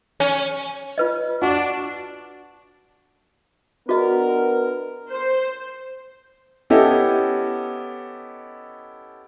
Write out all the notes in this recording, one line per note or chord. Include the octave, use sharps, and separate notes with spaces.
C#4
F4 B4 D#5
D4 F#4
B3 D4 F#4 A#4 D#5
C5
B3 C#4 E4 G4 A4 D#5